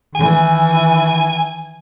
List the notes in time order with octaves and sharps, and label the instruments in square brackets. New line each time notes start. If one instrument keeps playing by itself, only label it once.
[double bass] D#3 E3 [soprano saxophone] G#5